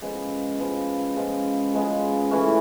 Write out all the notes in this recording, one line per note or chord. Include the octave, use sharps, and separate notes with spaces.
C#3 F3 G#3 B3
C#3 F3 G#3 B3
C#3 F3 G#3 B3
C#3 F3 G#3 B3
C#3 E3 A3 C#4